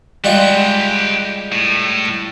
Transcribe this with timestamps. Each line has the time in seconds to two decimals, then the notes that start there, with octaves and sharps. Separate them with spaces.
0.24 G3 G#3 F4 G4 F#5
1.52 A2